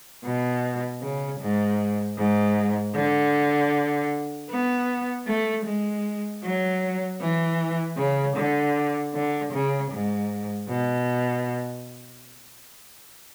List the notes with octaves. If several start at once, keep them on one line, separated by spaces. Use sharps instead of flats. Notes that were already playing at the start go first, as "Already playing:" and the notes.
B2
C#3
G#2
G#2
D3
B3
A3
G#3
F#3
E3
C#3
D3
D3
C#3
G#2
B2